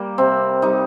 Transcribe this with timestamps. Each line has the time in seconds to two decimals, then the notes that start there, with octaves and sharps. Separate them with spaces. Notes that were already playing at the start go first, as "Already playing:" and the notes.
Already playing: G3 A#3
0.18 C3 C4
0.62 G3 D#4